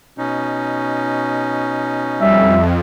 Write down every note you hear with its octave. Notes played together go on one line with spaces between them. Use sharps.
B2 C#4 D#4
F2 G3 E5